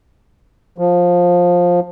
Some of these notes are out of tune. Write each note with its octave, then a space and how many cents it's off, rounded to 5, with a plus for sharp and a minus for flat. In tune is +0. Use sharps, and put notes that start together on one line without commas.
F3 +15